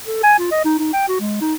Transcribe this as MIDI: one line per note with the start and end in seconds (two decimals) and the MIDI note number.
0.06 0.19 69
0.23 0.35 80
0.39 0.51 65
0.52 0.64 75
0.65 0.74 63
0.79 0.90 63
0.93 1.07 79
1.09 1.19 66
1.20 1.40 56
1.41 1.54 63